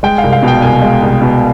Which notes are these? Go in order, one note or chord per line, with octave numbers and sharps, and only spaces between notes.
G#3 G5
F5
C2
F5
B2
G5
C2 G#5
G#3
C2
B2